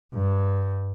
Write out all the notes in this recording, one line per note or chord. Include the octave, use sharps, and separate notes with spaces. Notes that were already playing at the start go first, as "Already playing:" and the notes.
G2